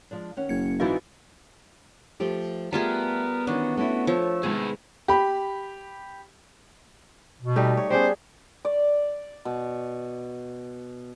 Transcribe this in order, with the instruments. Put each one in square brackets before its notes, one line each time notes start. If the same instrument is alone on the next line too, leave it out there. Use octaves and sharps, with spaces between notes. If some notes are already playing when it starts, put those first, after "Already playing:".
[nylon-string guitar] F3 G#3 D4
D#3 C#4 F#5
[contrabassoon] F#1 [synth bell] G#6 C#7
[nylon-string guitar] D2 C4 D#4 [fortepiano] G#2 E3 [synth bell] F#4 B4 F5
[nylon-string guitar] F3 A3 G4
[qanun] G3 F4 G#4 [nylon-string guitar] A3 A5 [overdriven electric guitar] B3 [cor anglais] A#4
[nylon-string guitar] D#3 E3 C#4 [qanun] D4 [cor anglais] F#4
[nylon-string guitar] A3 C#4 E4 [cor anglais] F#4
[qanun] F3 [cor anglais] A3 [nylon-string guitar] A4 C#5
[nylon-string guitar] C3 D#3 G#3 [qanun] B3 [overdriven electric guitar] G#4 B4
[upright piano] G4 B5
[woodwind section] B2
[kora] G3 A3 D#4
C#5
[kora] G3 D4 G#4 [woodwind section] B3 C#4 C5
[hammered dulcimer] D5
B2